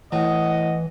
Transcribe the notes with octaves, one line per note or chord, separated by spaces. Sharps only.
A2 E3 D#5 F#5